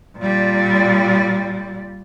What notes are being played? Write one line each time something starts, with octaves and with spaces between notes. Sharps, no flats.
A#2 G3